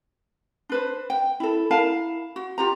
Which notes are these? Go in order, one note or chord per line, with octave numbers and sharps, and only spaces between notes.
D4 B4 C5
G5
E4 A4
E4 A#4 F5 A5
F#4
F4 G4 A#5